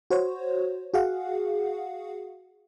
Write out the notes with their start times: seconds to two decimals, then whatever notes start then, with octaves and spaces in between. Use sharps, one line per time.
0.10 F#4 C5 C#5
0.94 F#4 G#4 F5 F#5